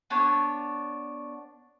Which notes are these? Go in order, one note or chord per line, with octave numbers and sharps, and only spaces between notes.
B3 D4 C#5